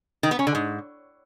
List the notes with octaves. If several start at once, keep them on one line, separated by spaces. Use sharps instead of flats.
D#3
B3
C#4
D3
G#2